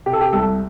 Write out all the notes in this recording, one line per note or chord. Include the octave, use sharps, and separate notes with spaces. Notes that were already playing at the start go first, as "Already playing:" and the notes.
C3 G4
A4
G4
C2 A4